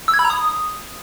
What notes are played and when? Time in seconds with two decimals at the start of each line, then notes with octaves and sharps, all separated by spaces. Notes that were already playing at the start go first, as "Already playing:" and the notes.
0.08 E6
0.14 G#6
0.19 B5
0.25 A#5
0.30 D#6